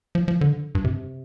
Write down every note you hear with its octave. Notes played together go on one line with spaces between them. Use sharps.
F3
F3
D3
G2
C3